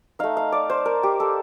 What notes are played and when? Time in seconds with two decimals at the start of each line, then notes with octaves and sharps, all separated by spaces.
0.19 A3 D#4 F5
0.37 F5
0.52 D5
0.70 C5
0.86 A#4
1.03 G4
1.20 A4